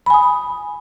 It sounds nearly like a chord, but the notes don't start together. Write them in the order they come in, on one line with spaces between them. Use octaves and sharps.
B5 G#5 D#6